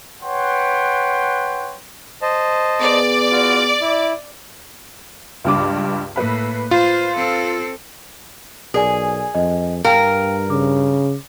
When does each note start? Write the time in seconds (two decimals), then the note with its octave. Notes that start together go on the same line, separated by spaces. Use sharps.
0.22 B4 C#5 F#5 G5 C6
2.22 C5 D#5 A5
2.81 B3 G#4 D5
3.31 F4 F#4
3.81 E4
5.44 C#2 G2 D6
6.16 A2 A#3 B4 B5
6.71 F4 C5
7.16 C4 A4
8.74 B1 G#4 A#4 D5 G#5
9.35 F2 D#5
9.85 G2 A#4 F5 G5
10.50 C#3 D6